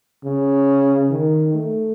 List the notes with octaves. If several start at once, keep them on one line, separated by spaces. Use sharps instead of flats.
C#3
D#3
A3